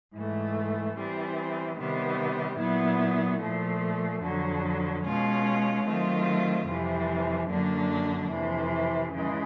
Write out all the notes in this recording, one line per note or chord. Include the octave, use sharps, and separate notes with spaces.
G#2 E3 A3
E3 G3 C4
C3 D#3 G3 B3
A#2 F#3 B3 E4
A#2 F3 A3
F2 D3 F#3
B2 G#3 C#4 F4
D#3 F#3 A3 C4 F4
F2 C3 E3 G3
F#2 D3 F#3 A#3 D4
F2 C3 E3
C#3 E3 G#3